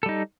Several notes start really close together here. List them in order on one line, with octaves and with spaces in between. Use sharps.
A4 G3 D#4